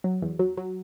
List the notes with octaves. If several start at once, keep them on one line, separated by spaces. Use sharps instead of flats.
F#3
E2
F#3
F#3